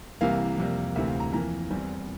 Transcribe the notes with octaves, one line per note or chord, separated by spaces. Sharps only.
C2 C3 E3 A#3 F5
F2 C3 G3 A#3
D2 C3 E3 A3 C4 E5
F5
A#5
F2 E3 A#3 A#5
E2 E3 G3 C4